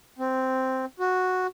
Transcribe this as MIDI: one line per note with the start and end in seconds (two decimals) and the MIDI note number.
0.19 0.85 60
1.00 1.47 66